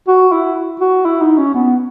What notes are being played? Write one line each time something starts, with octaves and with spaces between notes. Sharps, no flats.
F#4
E4
F#4
E4
D#4
C#4
B3